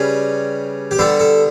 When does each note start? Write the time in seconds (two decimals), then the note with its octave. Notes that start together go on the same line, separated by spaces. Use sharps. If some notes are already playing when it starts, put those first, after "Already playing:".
Already playing: C#3 G3 C#4 B4
0.91 G4
0.99 D3 G3 B3 A4
1.19 A4